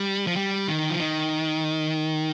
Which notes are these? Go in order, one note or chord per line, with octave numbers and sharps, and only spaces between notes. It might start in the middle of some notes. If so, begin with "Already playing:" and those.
Already playing: G3
F3
G3
D#3
F3
D#3